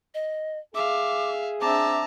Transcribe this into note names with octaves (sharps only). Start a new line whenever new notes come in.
D#5
G#4 E5 F5 D6
C4 D4 E5 A5 A#5 D6